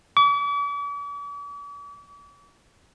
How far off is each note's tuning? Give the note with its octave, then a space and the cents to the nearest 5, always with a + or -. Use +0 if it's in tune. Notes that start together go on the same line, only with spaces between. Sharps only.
D6 -45